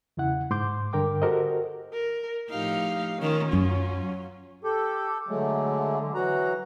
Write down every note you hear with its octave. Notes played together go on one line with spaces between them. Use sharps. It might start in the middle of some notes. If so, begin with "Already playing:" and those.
E2 C#3 E4 F#5
G#2 C6 D6 G6
G2 D3 A#4 G5 D6
F#4 G4 A4 A#4 C5 D#5
A#4
A2 F3 D#4 G4 F5
D#3 C#4 F4
F#2 F#3
G4 A4
D3 F#3 G#3 A3
E3 F#3 F#4 A#5